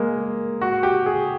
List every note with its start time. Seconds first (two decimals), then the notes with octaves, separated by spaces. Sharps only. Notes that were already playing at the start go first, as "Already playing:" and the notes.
Already playing: G#3 A#3
0.61 F#4
0.83 G4
1.06 G#4